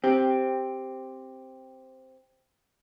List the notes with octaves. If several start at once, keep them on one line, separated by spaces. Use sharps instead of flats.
C4 G4